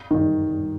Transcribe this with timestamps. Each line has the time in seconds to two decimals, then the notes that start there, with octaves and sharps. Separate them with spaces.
0.11 D#3 D#4